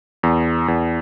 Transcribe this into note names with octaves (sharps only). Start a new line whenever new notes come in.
E2
E2